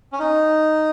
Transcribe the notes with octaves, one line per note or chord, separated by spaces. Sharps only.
C#4
D#4